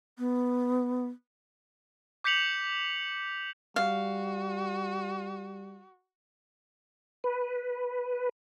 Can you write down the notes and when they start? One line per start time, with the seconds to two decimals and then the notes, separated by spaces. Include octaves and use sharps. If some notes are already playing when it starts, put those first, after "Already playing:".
0.18 B3
2.24 D6 G6 B6 C#7 F7 F#7
3.76 G3 F#4 F5
7.24 B4